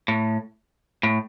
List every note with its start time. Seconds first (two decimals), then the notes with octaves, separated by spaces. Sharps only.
0.08 A2
1.03 A2